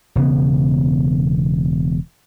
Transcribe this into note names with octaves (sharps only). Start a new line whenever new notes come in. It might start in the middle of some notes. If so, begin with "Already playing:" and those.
E1 C#3 B3